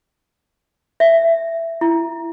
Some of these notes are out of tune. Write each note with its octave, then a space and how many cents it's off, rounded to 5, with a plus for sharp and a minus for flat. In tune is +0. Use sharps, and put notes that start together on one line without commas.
E5 +10
E4 +20